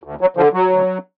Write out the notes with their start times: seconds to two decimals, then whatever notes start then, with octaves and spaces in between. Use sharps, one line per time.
0.03 D2
0.21 F#3
0.37 D3 F3
0.53 F#3
0.70 D2